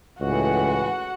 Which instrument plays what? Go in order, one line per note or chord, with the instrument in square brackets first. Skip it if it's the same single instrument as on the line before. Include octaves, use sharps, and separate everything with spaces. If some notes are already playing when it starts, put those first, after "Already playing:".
[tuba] C#2 [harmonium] A2 E3 [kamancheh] F#4 F#5